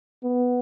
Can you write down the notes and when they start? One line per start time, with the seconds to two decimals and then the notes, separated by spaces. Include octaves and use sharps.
0.23 B3